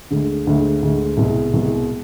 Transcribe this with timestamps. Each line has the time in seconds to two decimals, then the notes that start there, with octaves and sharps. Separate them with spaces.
0.10 D2 D3 G#3
0.47 D2 D3 G#3
0.83 D2 D3 G#3
1.17 C2 B2 G#3
1.53 C2 B2 G#3